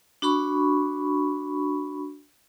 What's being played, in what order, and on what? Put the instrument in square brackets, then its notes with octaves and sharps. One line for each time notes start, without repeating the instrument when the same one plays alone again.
[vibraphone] D4 F#4 B5 C#6